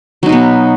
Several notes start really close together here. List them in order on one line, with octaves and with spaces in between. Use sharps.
F#3 D#4 B2 B3